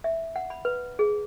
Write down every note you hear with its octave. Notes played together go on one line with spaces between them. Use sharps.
E5
F#5
B5
B4
G#4